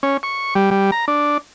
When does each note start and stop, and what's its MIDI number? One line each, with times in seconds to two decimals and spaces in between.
0.03 0.17 61
0.23 0.54 85
0.55 0.70 55
0.71 0.91 55
0.92 1.05 82
1.08 1.38 62